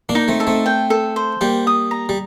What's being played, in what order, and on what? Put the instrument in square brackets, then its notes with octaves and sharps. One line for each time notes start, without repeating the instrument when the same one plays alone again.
[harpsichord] A#3 D4
[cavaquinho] D#4
[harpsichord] A3 C4
[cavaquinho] A4
[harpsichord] A3 C4
[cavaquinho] G5
A4
C5
[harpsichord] G3 A#3 [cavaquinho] G5
[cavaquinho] D#6
A#5
[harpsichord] G3